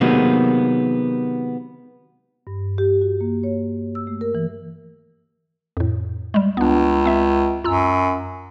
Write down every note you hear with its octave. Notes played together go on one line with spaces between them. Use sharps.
C3 D#3 F#3 G#3 A#3 B3
G2
G4
F#4
A#3
C#5
E6
A3
A#4
E3
F2 A2
G3 G#3
C#2 B3 D4
C4 E5
F#2 F4 A#5 E6